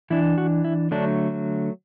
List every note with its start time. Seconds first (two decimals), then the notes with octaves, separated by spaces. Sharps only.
0.10 E3 D4 E4
0.38 F#4
0.64 E4
0.91 D3 F#3 A3 D4